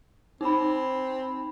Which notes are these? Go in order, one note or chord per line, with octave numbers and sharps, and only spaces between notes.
C4 D#4 B5